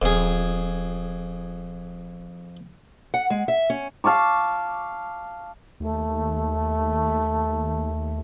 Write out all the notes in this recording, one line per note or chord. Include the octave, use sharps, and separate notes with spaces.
D#1 F2 G#4
F#5
G#3
E5
C#4
F5 A5 C#6 D6
D#2 A3